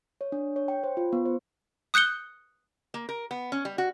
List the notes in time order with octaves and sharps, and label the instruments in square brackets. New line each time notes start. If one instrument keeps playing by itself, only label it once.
[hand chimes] C#5
D4
C#5
G5
C5
F4
B3
C5
[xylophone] D#6 F#6 G6 C#7 G7
[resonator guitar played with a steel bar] A#3
A#4
B3
C#4
G3
F#4